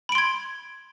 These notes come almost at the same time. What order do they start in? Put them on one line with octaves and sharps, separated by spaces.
B5 D7 C6 G#6